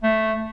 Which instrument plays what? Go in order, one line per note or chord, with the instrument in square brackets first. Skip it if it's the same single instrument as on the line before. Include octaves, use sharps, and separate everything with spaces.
[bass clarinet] A3